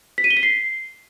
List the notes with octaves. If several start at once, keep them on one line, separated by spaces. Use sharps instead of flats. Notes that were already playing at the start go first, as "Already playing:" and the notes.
B6
D#7
G7
B6
C7